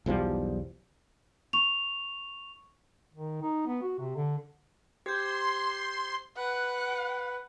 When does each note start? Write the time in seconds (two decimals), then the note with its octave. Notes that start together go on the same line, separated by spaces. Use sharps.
0.06 B1 E2 F3 G3
1.53 C#6 F7
3.14 D#3
3.42 D#4
3.67 B3
3.82 F#4
3.99 C3
4.16 D3
5.06 G4 C5 C6 G6 G#6
6.37 B4 F#5